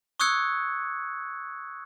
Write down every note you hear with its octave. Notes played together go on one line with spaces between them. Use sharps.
C#6 D#6 E6 F#6 G#6 C#7